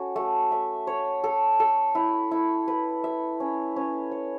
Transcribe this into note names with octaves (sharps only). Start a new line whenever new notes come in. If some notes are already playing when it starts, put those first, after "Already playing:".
Already playing: C#4 F#4 A4
A3
E5
C#5
A4
A4
E4
E4
B4
E5
C#4
C#4
C#5